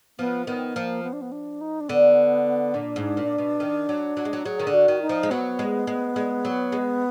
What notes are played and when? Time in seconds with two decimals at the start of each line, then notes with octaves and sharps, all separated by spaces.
0.19 F3 B3
0.47 D#3 B3
0.75 F3 A#3
1.03 B3
1.13 D4
1.22 B3
1.32 D4
1.61 D#4
1.81 D4
1.89 D3 B3
2.74 A#2 D4
2.96 G#2
3.17 A#2
3.38 B2
3.60 D#3
3.89 F#3
4.17 F#3
4.25 G#3
4.33 F#3
4.45 F#3 G#4
4.59 D#3
4.67 D3
4.74 F#4
4.88 D#3
5.02 D#4
5.09 F3
5.23 G#3
5.31 F#3 B3
5.59 G#3
5.87 G#3
6.16 G#3
6.45 F#3
6.72 G#3